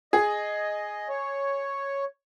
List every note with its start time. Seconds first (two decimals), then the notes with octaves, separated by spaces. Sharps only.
0.13 G#4 D#5
1.09 C#5